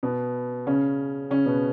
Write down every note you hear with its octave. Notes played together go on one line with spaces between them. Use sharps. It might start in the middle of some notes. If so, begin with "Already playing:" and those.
B2 B3
C#3 C#4
C#3 C#4
B2 B3